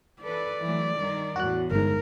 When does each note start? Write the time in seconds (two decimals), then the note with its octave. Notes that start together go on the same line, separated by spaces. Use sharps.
0.22 E3 A4 B4 D5
0.64 E3 F#3 A3
0.96 G2 D#3 A#4
1.36 E2 A2 F#4 F#6
1.71 G1 G#2 A#4